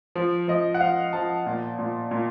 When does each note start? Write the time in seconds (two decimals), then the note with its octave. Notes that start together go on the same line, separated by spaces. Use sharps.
0.16 F3
0.48 F3 D#5
0.74 F#5
0.81 F3 F5
1.13 F3 A5
1.46 A#2
1.79 A#2
2.11 A#2